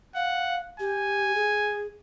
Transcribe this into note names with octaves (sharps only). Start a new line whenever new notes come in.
F5 F#5
G4 G#5
G#4